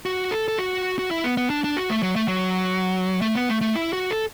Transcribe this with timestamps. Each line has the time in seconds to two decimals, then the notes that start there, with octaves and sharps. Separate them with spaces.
0.06 F#4
0.31 A4
0.48 A4
0.58 F#4
0.99 F#4
1.11 E4
1.24 B3
1.37 B3
1.50 D4
1.64 D4
1.77 F#4
1.90 A3
2.03 F#3
2.16 A3
2.28 F#3
3.22 A3
3.35 B3
3.49 A3
3.61 A3
3.75 E4
3.93 F#4
4.11 A4